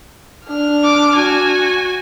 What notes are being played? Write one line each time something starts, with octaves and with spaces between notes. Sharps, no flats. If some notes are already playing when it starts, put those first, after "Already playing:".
D4 F6
D6
F#4 G#5